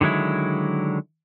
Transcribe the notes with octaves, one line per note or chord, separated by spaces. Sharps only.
D3 D#3 F#3 G#3 E4